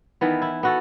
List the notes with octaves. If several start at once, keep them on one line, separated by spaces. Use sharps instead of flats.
D#3 E3 B3
E4
B3 F#4 A4